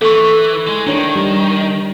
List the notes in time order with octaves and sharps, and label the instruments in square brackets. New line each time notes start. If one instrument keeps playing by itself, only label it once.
[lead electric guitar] E3 [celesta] A4 C#6
[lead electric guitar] G#3
[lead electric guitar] D#3 [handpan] D4 E4 C#5
[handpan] G3